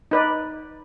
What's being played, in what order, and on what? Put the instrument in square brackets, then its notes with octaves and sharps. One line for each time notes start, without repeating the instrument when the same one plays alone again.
[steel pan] D#4 B4 D5